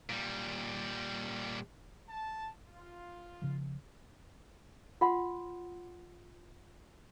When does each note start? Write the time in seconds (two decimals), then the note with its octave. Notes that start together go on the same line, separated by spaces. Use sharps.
0.09 A#2 G3
2.10 A5
2.66 F4
3.42 C#3 F3
5.01 F4 F#5 C6